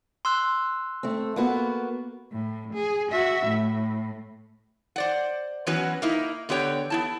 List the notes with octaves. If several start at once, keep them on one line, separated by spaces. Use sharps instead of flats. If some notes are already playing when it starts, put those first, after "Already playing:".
C6 E6 F#6
A3 C4
A#3 B3 F#4
A2
G#4
F#4 E5
A2
C5 D5 F#5
E3 F#3 B3 C#4 F#4 B4
A#3 D#4 E4
D3 B3 G4 C#5 G5
B3 E4 A5